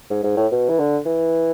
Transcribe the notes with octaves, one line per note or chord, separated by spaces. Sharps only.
G#2
G#2
A2
B2
E3
D3
E3